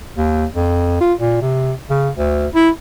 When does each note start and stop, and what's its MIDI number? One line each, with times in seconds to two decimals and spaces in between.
0.16 0.45 39
0.55 0.96 41
1.01 1.13 65
1.20 1.41 46
1.41 1.73 48
1.90 2.09 49
2.16 2.47 38
2.55 2.69 64